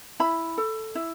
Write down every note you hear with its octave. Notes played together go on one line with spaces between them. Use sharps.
E4 B5
A4
E4